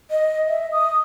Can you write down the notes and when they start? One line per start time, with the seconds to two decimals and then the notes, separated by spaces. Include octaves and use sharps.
0.11 D#5
0.48 E5
0.72 D#6